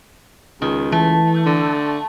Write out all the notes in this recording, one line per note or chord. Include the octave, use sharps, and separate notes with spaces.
C#2 D#3
E3 A3
D3